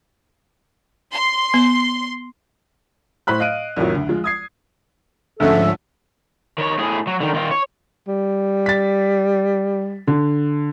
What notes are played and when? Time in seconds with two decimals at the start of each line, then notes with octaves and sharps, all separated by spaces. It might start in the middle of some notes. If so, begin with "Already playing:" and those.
1.13 C6
1.54 B3
3.27 A2 C5 B5 F#6
3.40 D#5 F5 F#6 D7 D#7
3.76 C2 F2 A2 D#3 F3 F#3
3.95 D2
4.09 F3 G#3 F4
4.24 D#6 G#6 C7
5.40 D2 G#2 F3 A3 C#4 A4 E5 F#5
6.58 D#3 C#5
6.78 A2 G#4
7.07 F#3
7.21 D3 D#3
7.34 D#3 F4
7.51 C#5
8.08 G3
8.66 A6 B6
10.08 D3